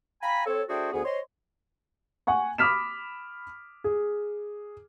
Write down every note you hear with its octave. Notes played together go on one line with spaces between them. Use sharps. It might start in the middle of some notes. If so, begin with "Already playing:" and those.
F5 G5 G#5 A#5 B5
C4 A4 C#5
A3 D4 F#4 G#4 C5 G5
D2 B3 G#4
C5 C#5 D#5 C6
F#5 G#5 C#6
B5 D6 D#6 F6 B6 E7
G#4